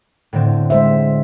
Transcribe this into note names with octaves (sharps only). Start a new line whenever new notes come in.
A2 D3 C4
G#3 C5 E5